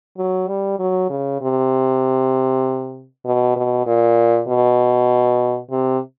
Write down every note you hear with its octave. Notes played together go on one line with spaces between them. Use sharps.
F#3
G3
F#3
C#3
C3
B2
B2
A#2
B2
C3